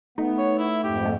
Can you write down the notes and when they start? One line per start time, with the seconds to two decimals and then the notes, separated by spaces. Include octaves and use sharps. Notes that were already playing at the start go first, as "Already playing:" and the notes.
0.18 A3 B3 D#4
0.38 C#5
0.58 E4
0.84 F2 G#2 G4
1.05 A3